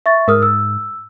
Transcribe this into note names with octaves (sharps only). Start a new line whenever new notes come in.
E5 C#6 A6
G#2 A#4 D#6 F6
E6